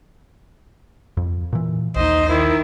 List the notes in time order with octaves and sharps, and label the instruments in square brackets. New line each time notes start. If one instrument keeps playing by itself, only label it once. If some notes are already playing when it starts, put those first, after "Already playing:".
[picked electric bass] F2
A#2 E3
[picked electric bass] A#1 D#2 [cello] D#4 C5 [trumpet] D#5
[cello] D#3 [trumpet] E4